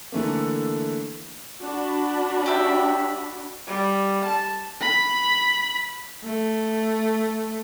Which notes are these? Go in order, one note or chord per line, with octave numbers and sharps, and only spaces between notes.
D3 E3 A3 A#3
D4 F#4 B5
G4 E5
G3
A5
B5
A3